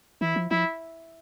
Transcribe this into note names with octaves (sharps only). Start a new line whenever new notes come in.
E3 E4
F3
F3 E4